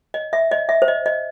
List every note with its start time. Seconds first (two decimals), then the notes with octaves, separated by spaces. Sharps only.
0.14 D#5
0.33 E5
0.51 D#5
0.69 E5
0.82 C5
0.88 D#5
1.06 D#5